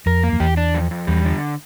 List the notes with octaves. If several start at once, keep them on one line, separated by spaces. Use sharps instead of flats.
F2 A#4
A#3
F2
E2 G4
D4
F2
F2
E2 G3
D3